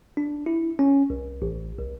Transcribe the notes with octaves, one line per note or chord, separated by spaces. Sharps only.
D4
E4
C#4
C2
A1
C2